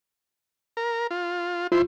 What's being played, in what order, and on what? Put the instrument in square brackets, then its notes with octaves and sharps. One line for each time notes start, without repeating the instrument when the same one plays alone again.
[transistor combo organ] A#4
F4
[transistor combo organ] E4 C5 [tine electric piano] F4